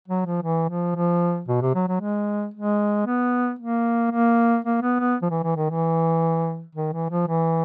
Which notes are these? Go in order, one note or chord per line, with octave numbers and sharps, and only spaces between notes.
F#3
F3
E3
F3
F3
B2
C3
F#3
F#3
G#3
G#3
B3
A#3
A#3
A#3
B3
B3
F3
E3
E3
D#3
E3
D#3
E3
F3
E3